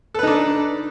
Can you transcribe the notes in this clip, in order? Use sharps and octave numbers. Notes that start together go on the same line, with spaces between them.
D4 D#4 A4 B4